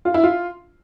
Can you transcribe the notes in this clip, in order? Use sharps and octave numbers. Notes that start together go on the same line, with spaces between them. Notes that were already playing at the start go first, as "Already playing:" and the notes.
F4
E4
F4